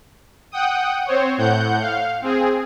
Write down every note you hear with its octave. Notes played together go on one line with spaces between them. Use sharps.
F#5 G5 D#6
C4 C5 C#5
A2 F#5 G6
F5
C4 G#4